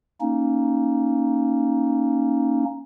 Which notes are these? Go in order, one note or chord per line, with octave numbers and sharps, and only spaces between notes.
A#3 C#4 D#4